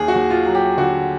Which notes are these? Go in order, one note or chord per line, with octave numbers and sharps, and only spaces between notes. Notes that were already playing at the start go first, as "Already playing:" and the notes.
Already playing: D#2 G#4
F#4
D#2
F4
F#3
G4
D3 F#4